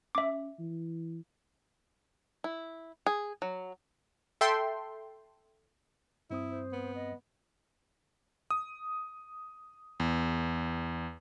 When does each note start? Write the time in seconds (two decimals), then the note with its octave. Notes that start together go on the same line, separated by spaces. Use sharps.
0.15 C#4 E5 D6
0.59 E3
2.44 E4
3.06 G#4
3.42 F#3
4.41 A4 E5 G5 C6
6.30 G2 C4 E4 D#6
6.50 C5
6.73 B3
6.95 D#5
8.51 D#6
10.00 E2